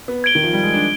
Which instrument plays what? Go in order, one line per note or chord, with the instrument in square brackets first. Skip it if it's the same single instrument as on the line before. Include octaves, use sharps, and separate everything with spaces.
[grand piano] B3
[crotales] G#6 D7 G7
[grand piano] D#3
F3
G3
G#3
D4